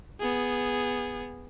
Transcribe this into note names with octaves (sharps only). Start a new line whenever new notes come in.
B3 G#4